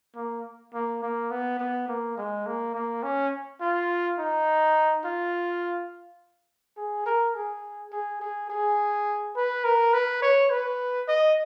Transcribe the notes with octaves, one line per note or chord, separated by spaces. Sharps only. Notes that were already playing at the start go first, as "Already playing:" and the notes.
A#3
A#3
A#3
B3
B3
A#3
G#3
A#3
A#3
C#4
F4
D#4
F4
G#4
A#4
G#4
G#4
G#4
G#4
B4
A#4
B4
C#5
B4
D#5